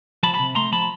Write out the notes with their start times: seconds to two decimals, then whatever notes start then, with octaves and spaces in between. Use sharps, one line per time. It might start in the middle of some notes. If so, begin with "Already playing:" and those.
0.23 F3 A5 B5
0.34 A5 B5
0.39 C3
0.55 A3 A#5 C6
0.72 F3 A5 B5